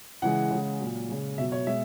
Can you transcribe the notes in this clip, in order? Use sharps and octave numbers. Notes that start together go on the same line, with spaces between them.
C#3 E3 G#3 F#5
C#3 G#3
A#2 F#3
C#3 G#3
B2 F#3 E5
C#5
B2 G#3 E5